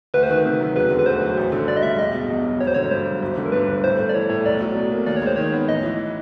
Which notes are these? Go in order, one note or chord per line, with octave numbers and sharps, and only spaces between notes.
D2 B4
C5
D#3 B4
C3
F#3
E1 B4
D3
B4
D2 C5
F#3
A1
D3
G2 D5
D#5
G3 E5
E1 D#5
B2
E2
F#3
G#1 C#5
C5
D3 C#5
G2 C5
F#3
G1
D3
A#4
G2 B4
G1
A2 C5
A3
D5
E3 C#5
A2 C#5
B1 D5
F#3
B2
A#3
D#2 D5
C#5
G#3 C5
D#3 C#5
B3
A1 D#5
E3